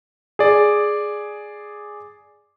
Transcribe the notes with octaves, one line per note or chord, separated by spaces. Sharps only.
G#4 D5